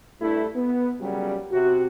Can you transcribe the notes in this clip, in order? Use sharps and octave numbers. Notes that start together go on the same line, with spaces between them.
G2 A3 E4
B3
A#2 C#3 F#3 G3
C3 F#4